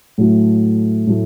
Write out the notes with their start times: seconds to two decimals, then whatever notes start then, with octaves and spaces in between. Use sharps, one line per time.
0.18 A2 F#3 A3
1.07 A2 F#3 A3